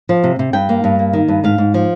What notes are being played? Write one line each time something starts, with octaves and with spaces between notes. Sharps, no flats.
F3
C3
C3
G2 G5
A#3
G2
A#3
D#3
G2
G#2 F5
G#2
F3